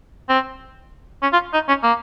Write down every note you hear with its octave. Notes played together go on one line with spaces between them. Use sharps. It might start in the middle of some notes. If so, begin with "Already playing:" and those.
C4
C#4
F4
D#4
C#4
A#3